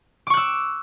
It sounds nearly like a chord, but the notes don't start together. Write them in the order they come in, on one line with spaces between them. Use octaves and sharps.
D6 C#6 F#6 E6